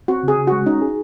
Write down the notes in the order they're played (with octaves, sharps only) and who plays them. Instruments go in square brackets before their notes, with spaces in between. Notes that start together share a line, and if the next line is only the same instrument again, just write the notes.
[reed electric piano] C4 [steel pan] F#4
[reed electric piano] C#3 [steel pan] G#4
[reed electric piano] C#3
[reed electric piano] G#3 [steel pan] F#4
[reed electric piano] C#4 [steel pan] D#4
[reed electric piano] G#4